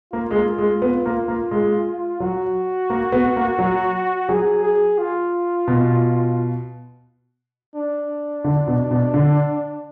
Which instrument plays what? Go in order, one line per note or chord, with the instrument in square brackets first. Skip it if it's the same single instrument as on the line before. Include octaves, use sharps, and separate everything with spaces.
[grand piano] A#3 [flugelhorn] F4
[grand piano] G#3
A#3
G#3
B3
A#3
A#3
G#3
[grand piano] F#3 [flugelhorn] F#4
[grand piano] A#3
B3
A#3
F#3
[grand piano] F#3 [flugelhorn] G#4
[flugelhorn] G#4
F4
[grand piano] B2
[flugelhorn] D4
[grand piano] D3
B2
B2
D3